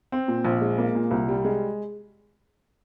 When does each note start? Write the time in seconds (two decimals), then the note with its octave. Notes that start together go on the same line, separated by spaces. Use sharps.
0.12 C4
0.28 A#2
0.45 A#1
0.61 G#3
0.78 A#3
0.95 A#2
1.11 C2
1.28 G3
1.45 G#3